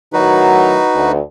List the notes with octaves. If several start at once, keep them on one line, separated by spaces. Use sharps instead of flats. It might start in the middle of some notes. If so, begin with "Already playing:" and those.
A2 D#3 F#3 D#4 F#4 B4
D2